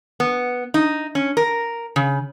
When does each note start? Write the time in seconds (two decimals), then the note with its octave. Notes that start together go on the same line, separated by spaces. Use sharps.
0.20 B3
0.74 D#4
1.15 C#4
1.37 A#4
1.96 C#3